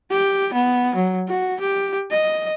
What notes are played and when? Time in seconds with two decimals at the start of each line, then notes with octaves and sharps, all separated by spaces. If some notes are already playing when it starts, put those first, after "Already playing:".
0.11 G4
0.54 B3
0.95 F#3
1.28 F#4
1.60 G4
2.11 D#5